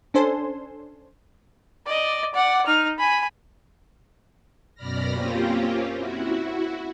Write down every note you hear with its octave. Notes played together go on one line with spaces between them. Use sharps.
C#4 D4 A4 C5 G#5 C6
D5 D#5
D5 F#5
D#4 F6
G#5 B5
F#2 B2 D5 B5 F6 A#6
A#3 C4 C#4 F4 G4
E4 F#4